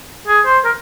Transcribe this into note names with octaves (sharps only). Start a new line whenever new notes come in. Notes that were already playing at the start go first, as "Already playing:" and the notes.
G#4
C5
A#4